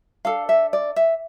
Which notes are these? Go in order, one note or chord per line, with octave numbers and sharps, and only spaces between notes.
D4 A4 F5
E5
D5
E5